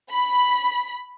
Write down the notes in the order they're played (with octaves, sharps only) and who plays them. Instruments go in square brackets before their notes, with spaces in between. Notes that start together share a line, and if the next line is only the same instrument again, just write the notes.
[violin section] B5